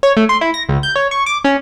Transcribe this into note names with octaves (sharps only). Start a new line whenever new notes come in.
C#5
A3
C6
E4
A#6
C#2
G6
C#5
C#6
D6
C#4